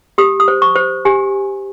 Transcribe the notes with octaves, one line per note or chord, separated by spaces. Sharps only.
G4 D#6
D#6
C5
C#6
C5
G4 G#5